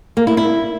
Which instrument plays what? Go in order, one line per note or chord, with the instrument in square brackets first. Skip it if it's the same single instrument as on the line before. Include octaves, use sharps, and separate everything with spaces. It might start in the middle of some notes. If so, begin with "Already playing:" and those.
[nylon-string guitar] A#3
E4
E4